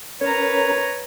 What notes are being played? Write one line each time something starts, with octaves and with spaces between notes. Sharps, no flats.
C#4 A#4 B4 C#5 A#5